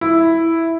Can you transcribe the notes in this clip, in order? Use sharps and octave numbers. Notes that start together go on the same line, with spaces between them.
E4